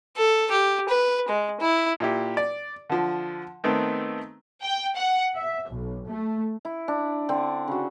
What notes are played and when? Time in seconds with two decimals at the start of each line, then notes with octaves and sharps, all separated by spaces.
0.17 A4
0.51 G4
0.89 B4
1.28 G#3
1.60 E4
2.00 A#2 E4 G4
2.37 D5
2.90 D3 F3
3.64 D#3 A3 B3 C4
4.63 G5
4.96 F#5
5.35 E5
5.69 B1
6.08 A3
6.65 E4
6.88 D4
7.29 D3 C4
7.68 C#3 F#4